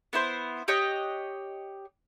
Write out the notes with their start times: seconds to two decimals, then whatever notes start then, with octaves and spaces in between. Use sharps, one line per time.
0.13 B3 E4 C5
0.68 G4 C#5 D#5 F#6